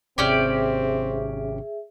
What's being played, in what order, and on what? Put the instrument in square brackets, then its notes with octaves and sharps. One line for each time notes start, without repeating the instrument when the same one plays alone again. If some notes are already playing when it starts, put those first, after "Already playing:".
[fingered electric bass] G#1 C3 [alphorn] C4 [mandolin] C#4 G4 D5 [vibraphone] G#4 E5